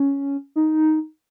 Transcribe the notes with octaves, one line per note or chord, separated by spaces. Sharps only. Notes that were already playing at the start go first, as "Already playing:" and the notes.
Already playing: C#4
D#4